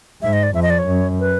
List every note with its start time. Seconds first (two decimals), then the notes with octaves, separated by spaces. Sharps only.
0.22 G#2 E5
0.33 D#5
0.43 D5
0.54 F2 E5
0.63 D#5
0.70 D5
0.79 C#5
0.87 F#2
1.20 B4